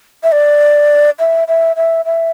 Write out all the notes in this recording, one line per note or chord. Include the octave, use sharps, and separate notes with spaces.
E5
D5
E5
E5
E5
E5